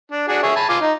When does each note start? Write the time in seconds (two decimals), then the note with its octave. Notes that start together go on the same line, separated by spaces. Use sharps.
0.11 D4
0.28 D4 F#4 G#4
0.43 G#4 C#5 E5
0.56 G#5 A5 B5
0.69 F4 G#5 D6
0.81 D#4